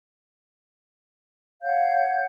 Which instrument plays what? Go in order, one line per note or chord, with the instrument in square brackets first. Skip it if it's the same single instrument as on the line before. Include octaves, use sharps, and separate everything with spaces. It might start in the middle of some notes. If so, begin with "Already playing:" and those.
[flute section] C#5 F#5 G6 [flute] F5